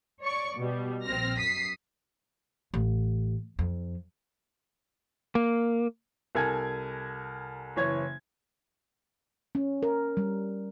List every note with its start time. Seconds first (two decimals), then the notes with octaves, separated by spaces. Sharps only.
0.23 C#5 D5 C#6
0.56 B2 G3
1.03 A#1 C4 F6 A#6
1.38 F#2 D#6 B6 C7
2.74 A1
3.59 F2
5.35 A#3
6.35 C2 A4 A#4 G#5 G#6
7.76 F#1 E3 C#5 G#6
9.55 C#4
9.83 A#4
10.17 G3